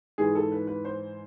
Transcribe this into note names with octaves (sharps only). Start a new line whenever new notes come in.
G#2 E3 G#4
A4
B4
B4
C5